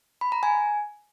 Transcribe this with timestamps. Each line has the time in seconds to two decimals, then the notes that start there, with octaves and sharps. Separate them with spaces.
0.21 B5
0.32 A#5
0.43 G#5